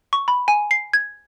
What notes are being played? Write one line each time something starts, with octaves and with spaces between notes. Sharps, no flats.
C#6
B5
G#5
C7
G#6